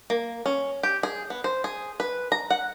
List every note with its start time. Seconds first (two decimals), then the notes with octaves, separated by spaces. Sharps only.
0.10 A#3
0.46 C#4
0.83 G4
1.03 G#4
1.30 B3
1.44 C5
1.64 G#4
2.00 B4
2.32 A#5
2.51 F#5